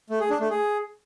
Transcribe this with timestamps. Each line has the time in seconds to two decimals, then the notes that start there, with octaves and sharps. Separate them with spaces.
0.10 A3
0.20 G#4
0.30 D4
0.40 A3
0.50 G#4